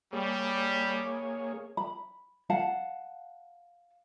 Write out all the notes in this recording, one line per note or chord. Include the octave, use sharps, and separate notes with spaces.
G3 A#3 G#4 C#5
B5
F5 F#5 A5